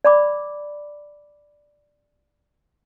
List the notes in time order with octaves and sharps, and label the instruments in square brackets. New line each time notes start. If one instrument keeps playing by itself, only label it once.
[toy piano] D5 B5 D6